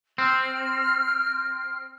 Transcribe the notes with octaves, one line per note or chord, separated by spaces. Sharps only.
C4 F6